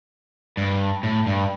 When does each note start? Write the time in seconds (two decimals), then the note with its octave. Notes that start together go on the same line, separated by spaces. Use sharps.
0.57 G2
1.03 A2
1.27 G2